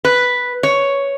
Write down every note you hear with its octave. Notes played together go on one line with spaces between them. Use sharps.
B4
C#5